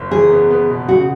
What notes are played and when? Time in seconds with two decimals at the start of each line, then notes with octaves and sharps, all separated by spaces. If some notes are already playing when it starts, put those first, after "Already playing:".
Already playing: F#1
0.11 E2 G#4
0.31 B3
0.50 B3
0.69 B2
0.88 C#3 F#4